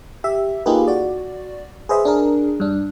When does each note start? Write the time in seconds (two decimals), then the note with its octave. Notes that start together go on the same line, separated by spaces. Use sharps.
0.24 G4 E5
0.66 A#3 D#4 F4 G4 G#4 B4
0.87 F#4 D5
1.89 G#4 B4 C5 D#5 E5
2.05 D4 G#4 A#4
2.60 G2 D4